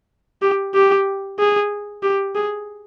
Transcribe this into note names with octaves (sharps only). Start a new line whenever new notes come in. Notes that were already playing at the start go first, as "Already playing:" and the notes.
G4
G4
G#4
G4
G#4